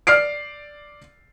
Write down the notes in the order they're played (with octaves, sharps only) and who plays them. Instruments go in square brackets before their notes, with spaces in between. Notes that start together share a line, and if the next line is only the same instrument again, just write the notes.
[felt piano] D5 F6 C7 D7